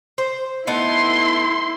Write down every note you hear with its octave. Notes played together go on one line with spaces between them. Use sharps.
C5
A3 B3 D#4 E4 C6